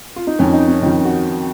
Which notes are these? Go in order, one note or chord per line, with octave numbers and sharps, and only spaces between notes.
F4
D#4
F2 D#3 C#4
D#4
C#4
F2 D#3 D#4
F#4